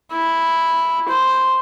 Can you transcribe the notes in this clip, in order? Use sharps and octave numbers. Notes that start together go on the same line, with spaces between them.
E4
C5